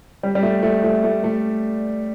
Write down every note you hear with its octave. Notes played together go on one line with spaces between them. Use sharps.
G3
G3
A3
A3
A3
A3
A3